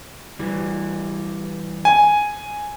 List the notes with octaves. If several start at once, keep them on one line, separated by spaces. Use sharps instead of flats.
E3 G3
G#5